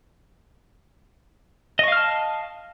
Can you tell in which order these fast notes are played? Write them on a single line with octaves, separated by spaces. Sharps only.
D#5 C#6 F5 F6 A5